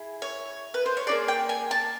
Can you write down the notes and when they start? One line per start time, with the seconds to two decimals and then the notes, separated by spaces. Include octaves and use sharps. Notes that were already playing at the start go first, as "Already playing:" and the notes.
Already playing: E4 G#4
0.22 C#5
0.74 B4
0.86 C5
0.97 C#5
1.07 A#3 D#4 G#4 D5
1.28 G5
1.49 G#5
1.71 A5